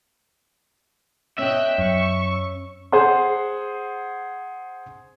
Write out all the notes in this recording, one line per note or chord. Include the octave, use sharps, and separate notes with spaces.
B2 C#4 D#5 E5 G5 F#6
F#2 C#6
G#4 C5 F#5 C6